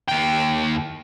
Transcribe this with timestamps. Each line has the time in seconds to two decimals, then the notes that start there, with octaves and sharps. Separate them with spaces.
0.09 D#2 G5